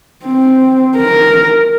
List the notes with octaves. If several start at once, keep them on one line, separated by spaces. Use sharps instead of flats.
C4
A#4